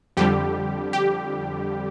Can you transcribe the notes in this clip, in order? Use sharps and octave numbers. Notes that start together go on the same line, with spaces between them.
F2 D3 G3 G4
G4